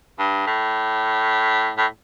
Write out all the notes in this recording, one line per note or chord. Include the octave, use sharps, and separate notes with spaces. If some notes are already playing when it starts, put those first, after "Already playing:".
G2
A2
A2